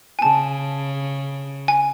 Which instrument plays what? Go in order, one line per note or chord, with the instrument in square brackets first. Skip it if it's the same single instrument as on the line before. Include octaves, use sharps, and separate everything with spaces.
[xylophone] G#5
[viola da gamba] C#3 [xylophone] A5
[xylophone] G#5